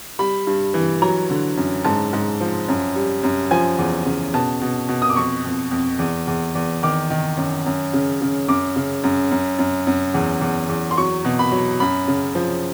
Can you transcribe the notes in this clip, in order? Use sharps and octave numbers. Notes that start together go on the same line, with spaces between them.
G3 B5
G2
E3
F#3 A#5
D3
F#2
G#2 A5
G#2
F3
F#2
G3
F#2
F3 G#5
E2
C#3
B2 A5
B2
B2
D#6
D6
F2 C#6
F2
F2
E2
E2
E2
D#3 D6
D#3
F#2
F#2
C#3
C#3
F#2 D6
C#3
F#2
F#2
F#2
F#2
E2
E2
E2
C6
F#3 C#6
B2
B5
F#3
F#2 B5
C#3
F3